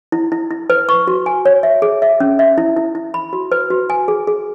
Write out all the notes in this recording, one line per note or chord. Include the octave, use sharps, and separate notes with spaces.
E4
E4
E4
B4
C#6
F#4
G#5
C#5
E5
G#4
E5
C#4
E5
E4
E4
E4
B5
F#4
B4
F#4
G#5
G#4
G#4